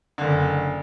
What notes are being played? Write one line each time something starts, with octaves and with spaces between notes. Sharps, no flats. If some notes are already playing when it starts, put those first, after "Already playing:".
F#1 D3